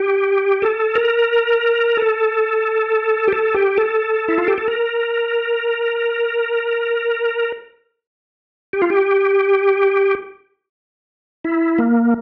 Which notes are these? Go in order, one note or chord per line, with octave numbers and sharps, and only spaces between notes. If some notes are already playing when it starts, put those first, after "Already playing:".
Already playing: G4
A4
A#4
A4
G4
A4
G4
A4
E4
F4
G4
A4
A#4
G4
F4
G4
E4
A#3